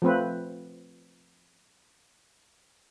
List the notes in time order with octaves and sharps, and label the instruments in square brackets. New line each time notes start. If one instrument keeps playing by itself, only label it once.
[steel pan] F3 A3 C4 B4